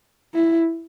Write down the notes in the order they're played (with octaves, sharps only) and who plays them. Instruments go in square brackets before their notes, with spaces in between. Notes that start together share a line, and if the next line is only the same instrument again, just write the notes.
[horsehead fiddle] E4